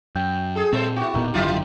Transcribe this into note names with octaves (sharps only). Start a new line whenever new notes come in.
F#2 G5
G#4 A4
A#2 G3 C4 A4 C5
E4 F#4 G4
E1 A#2 D#3 B3
G#1 F#2 D3 F#3 E4 F4